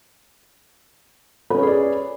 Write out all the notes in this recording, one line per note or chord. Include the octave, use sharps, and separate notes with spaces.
C#4 G#4 B4 C#5 D5